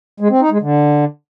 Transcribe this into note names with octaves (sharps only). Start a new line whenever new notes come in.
G#3
C4
D#4
G#3
D3